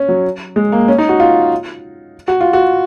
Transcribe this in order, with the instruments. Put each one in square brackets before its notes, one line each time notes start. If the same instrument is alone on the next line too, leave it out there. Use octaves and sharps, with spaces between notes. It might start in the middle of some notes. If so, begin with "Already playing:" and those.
Already playing: [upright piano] C#4
F#3
G#3
A#3
C#4
D#4
F#4
F4
F#4
F4
F#4